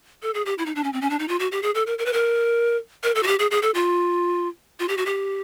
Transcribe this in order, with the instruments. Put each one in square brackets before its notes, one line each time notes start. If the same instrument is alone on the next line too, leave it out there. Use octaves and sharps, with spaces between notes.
[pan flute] A4
G#4
G4
E4
D#4
D4
C#4
C4
C#4
D4
D#4
F4
F#4
G4
G#4
A4
A#4
A#4
B4
A#4
A#4
A4
F#4
G4
G#4
G#4
A4
F4
F4
G4
F#4
G4